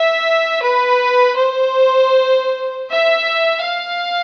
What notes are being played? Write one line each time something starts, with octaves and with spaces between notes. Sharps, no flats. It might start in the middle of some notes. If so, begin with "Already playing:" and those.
Already playing: E5
B4
C5
E5
F5